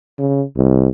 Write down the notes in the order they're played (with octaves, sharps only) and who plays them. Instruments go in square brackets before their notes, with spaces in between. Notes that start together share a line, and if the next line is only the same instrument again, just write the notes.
[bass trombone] C#3
C2